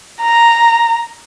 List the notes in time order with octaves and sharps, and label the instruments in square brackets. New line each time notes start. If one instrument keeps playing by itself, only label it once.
[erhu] A#5